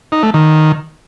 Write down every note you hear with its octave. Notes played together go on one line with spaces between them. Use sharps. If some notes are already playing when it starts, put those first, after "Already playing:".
D#4
A3
D#3